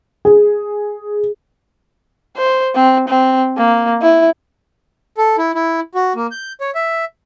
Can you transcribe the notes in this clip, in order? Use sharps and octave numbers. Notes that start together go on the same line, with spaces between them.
G#4
C5
C4
C4
A#3
E4
A4
E4
E4
F#4
A#3
G6
C#5
E5